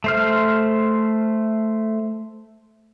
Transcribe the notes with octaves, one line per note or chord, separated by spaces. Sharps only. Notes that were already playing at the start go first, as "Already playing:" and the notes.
A3 C5 F6